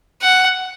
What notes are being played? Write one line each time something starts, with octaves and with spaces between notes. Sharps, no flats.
F#5